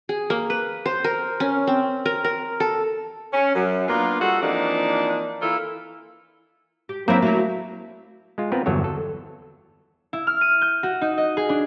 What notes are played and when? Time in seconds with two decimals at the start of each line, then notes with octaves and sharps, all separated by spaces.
0.09 G#4
0.30 A#3
0.50 B4
0.86 C5
1.04 A#4
1.40 C#4
1.67 C4
2.06 A#4
2.25 A#4
2.60 A4
3.34 C#4
3.55 F#2
3.88 A#3 B3 D4 F4
4.20 G3 D#4 F4 F#4 A4
4.41 E3 F3 A#3 C4 D4 D#4
5.42 E3 A#3 E4 F4 A4
6.89 G4
7.08 F#3 A#3 C4 E4
7.22 F#3 A3 E4
8.38 G#3 F4
8.52 B3 C4 F4 A#4 B4
8.66 G1 E2 F#3 A4 C#5
8.84 A4
10.13 E4
10.27 F6
10.41 D#7
10.61 G6
10.83 F#4
11.01 D#4
11.18 D#5
11.37 G#4
11.49 D4